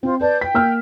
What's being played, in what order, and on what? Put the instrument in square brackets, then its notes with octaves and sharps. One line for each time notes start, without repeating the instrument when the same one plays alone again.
[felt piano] C4 [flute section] F4 C5
[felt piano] B4 [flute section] D5 A5 G6
[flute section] G5 [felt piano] B6
[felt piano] A#3 E6 F6